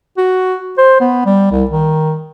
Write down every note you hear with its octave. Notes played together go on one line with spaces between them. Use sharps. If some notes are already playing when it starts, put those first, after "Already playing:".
F#4
C5
B3
G3
C2
D#3